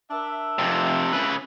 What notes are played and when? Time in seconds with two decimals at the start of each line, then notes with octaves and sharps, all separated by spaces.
0.11 D4 A#4 E5
0.59 F2 C3
1.13 C#3 B4